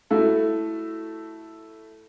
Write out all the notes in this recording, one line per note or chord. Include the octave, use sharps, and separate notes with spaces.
A3 E4 F#4 A4